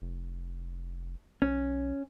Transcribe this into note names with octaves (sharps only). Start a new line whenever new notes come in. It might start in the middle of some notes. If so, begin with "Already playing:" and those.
F1
B1 C#4